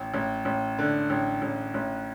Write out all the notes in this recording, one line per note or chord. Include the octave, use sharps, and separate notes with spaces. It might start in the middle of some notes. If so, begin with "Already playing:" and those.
Already playing: A1
A1
A1
D3
A1
A1
A1